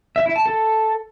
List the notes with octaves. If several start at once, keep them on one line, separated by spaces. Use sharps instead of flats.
E5
E4
A5
A4